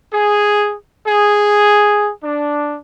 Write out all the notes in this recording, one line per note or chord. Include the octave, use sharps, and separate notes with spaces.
G#4
G#4
D4